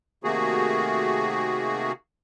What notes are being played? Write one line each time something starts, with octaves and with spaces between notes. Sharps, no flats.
C3 D#3 A3 A#3 F#4 G#4